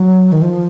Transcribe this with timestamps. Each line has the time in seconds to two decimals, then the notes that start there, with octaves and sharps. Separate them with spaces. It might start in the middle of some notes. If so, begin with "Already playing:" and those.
Already playing: F#3
0.32 D#3
0.42 F3